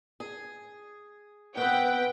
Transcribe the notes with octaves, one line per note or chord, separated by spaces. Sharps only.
G#4
B2 C4 B4 F#5 G5